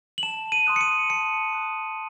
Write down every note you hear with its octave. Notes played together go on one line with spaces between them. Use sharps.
F#7
A5 E7
D#7
C6 D#6 F#6
C#7
D#7
A5 C#7
D#6 F#6